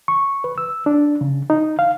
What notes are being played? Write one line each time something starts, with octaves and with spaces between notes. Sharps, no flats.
C#6
B4
E6
D4
C#3
D#4
F5